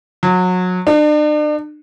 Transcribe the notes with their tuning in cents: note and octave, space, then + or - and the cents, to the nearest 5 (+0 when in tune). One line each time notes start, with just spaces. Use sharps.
F#3 -25
D4 +40